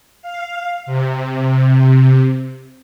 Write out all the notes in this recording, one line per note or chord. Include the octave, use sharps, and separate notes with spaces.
F5
C3